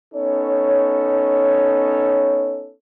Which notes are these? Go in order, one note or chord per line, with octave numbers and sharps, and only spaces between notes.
B3 C#4 D#4 A4 C#5